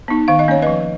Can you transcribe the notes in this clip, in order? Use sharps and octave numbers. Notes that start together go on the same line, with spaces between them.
B3 D#4
D#3 F5
D#5
A#3 C#4 C#5
F3 B4 D#5